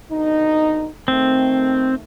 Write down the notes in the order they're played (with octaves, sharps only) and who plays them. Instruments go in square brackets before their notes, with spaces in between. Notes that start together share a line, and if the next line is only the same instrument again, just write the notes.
[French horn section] B2 D3 D#4
[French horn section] D#3 A3 [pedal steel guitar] C4